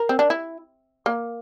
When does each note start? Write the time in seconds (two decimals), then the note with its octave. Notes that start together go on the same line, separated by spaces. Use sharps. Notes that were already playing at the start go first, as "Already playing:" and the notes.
Already playing: A#4
0.09 C4
0.19 D4
0.30 E4
1.06 A#3